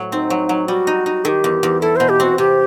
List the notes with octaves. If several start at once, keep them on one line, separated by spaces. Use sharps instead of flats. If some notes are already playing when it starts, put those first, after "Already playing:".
Already playing: A2 F#3
C4 D#4
F#3
F#3
G3 F#4
D#4
D#4
D#3 G4 A4
E2
E2
E4 A4
B2 C5
G4
C4 F#4
C3 G4